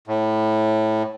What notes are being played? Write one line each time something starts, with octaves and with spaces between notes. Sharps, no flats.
A2